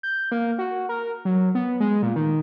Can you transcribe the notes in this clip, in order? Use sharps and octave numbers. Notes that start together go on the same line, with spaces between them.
G6
A#3
F#4
A#4
F#3
B3
G#3
A#2
D#3